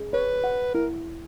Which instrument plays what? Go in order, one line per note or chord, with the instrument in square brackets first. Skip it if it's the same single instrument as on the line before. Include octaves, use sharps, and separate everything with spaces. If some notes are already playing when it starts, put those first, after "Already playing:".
Already playing: [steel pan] G#4
[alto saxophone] B4 [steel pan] C#5
[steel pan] F#5
[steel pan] E4 [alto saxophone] A#4